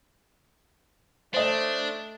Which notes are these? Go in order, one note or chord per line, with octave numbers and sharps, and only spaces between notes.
A3 D4 C5 D#5